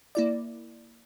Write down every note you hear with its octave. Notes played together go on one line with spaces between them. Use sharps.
A#3 E4 D5